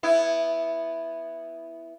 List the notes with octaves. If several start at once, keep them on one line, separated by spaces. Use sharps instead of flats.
B3 E4